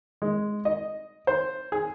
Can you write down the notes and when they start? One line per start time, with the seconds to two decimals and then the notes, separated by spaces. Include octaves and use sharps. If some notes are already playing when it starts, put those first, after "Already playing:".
0.22 G#3
0.65 D#5
1.27 C5
1.72 G#4